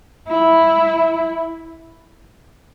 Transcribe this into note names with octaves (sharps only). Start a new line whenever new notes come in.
E4